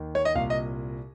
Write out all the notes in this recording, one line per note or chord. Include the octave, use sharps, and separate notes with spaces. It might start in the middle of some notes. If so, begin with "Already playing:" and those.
Already playing: D#2 D#3
C#5
D#5
C2 A#2 F5
D#5